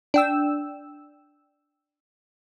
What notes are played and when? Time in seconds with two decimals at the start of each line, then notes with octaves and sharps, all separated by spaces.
0.14 D4 G5 E6